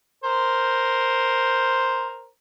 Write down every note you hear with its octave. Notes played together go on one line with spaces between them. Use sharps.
A#4 C5